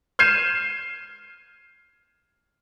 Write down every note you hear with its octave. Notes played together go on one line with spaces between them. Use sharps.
F6 G6 G#6 C7 D#7 E7